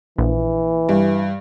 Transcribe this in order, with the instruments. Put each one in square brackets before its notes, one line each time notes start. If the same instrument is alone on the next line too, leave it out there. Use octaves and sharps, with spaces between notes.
[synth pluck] A#1 [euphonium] E3
[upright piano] G2